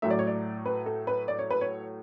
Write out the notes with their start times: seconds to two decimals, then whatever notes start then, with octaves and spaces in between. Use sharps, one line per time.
0.02 A2 F#3 A3 E5
0.10 D5
0.19 C#5
0.27 D5
0.66 B4
0.86 A4
1.07 B4
1.28 D5
1.39 C#5
1.51 B4
1.61 C#5